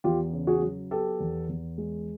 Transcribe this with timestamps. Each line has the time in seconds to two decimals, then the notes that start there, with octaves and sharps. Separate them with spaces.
0.04 E2 F4 G4
0.33 C#3
0.47 F#4 G#4
0.62 F#3
0.91 B3 G4 A4
1.20 E2
1.49 E2
1.78 G#3